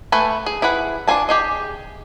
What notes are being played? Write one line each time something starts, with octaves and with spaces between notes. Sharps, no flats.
A3 B4 G#5
G#4
E4 G#4 B4 F#5
D4 F4 G#5 A5
G4 G#4 D#5